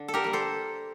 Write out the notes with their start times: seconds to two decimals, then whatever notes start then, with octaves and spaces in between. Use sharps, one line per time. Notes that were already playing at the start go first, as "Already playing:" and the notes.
Already playing: D3
0.08 A4
0.14 G4 A#4
0.24 G3 A#3
0.33 A4 C5